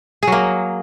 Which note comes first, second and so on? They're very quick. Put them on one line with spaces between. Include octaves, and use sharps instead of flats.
G#4 F#3 A#3